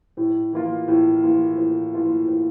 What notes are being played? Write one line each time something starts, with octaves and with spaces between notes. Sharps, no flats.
A2
E3 A#3 F4
A2
E3 A#3 F4
A2
E3 A#3 F4
A2